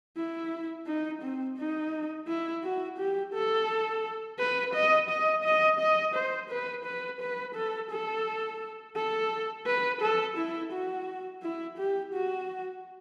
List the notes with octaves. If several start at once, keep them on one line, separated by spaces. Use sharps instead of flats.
E4
D#4
C4
D#4
E4
F#4
G4
A4
B4
D#5
D#5
D#5
D#5
C5
B4
B4
B4
A4
A4
A4
B4
A4
E4
F#4
E4
G4
F#4